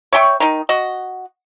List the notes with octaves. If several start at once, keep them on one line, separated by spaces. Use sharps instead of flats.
C#5 E5 G5 C#6
D#3 D#4
F#4 D#5